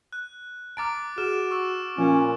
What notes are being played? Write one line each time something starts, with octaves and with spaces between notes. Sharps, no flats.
F#6
A5 A#5 D6 F6 A6 D7
F#4 G#4 F6 E7
C#6 E6
A#2 F3 C#4 F4